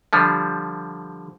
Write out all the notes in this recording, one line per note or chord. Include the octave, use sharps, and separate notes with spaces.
D3 F3 G3